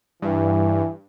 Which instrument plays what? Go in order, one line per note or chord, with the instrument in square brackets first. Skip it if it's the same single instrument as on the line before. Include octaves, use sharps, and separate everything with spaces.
[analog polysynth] G2 [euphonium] E3